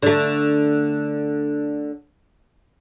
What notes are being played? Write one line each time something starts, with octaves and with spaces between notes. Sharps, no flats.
D3 A3